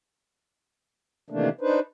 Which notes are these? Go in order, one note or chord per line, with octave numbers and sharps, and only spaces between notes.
C3 D#3 E3 A3 A#3 D4
D4 D#4 B4 C5